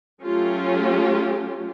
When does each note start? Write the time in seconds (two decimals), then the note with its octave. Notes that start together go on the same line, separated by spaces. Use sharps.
0.22 F#3 A3 C#4 F4 G4